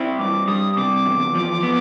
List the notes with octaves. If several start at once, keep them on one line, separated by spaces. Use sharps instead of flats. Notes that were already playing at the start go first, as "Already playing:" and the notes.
Already playing: C4 E4
G2 D6
G3 D#6
C3 D6
E2
F3
B3